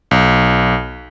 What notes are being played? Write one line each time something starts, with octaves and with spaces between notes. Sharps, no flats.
B1